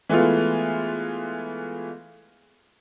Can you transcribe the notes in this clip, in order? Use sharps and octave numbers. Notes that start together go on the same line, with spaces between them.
E3 G#3 A3 B3 F4